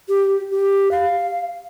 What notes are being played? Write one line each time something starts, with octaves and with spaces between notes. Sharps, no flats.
G4
G4
F5